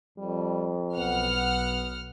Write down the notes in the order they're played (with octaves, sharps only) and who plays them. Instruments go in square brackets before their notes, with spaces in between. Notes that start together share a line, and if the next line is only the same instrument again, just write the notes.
[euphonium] F2 [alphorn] G3
[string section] B1 F#5 F6 [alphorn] B3